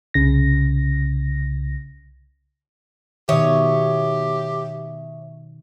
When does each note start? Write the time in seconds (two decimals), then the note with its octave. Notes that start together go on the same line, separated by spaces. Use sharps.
0.14 C2 C#3 A#6
3.29 B2 D#3 G4 C#5 E5 D#6